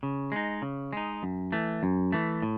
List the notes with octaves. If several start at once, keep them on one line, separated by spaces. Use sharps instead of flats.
C#3
G#3 D#4
C#3
G#3 D#4
F#2
E3 A3
F#2
E3 A3
A2